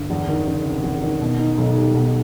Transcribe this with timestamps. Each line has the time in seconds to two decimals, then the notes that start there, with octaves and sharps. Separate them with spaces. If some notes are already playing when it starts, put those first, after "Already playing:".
Already playing: G1
0.10 E2
0.28 D#3
0.47 F#1
0.66 C3
0.84 E2
1.02 D#3
1.21 B2
1.39 D#4
1.58 B1
1.76 G3
1.95 B2